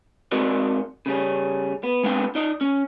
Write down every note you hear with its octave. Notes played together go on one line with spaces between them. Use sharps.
G#2 C4 F#4 A#4 D5 D#5
C#3 G3 C#4
B3
G#3 B3 C4 D4 F5 G5
D#4 D5 D#5
C#4